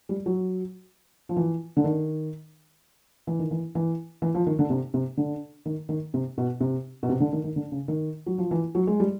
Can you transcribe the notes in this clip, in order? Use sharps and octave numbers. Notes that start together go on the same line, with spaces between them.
G3
F#3
F3
E3
D3
D#3
E3
D#3
E3
E3
E3
F3
D#3
D3
C3
C3
D3
D#3
D#3
C3
B2
C3
B2
C3
D3
D#3
D#3
D3
C#3
D#3
F#3
F3
E3
F#3
G#3
G3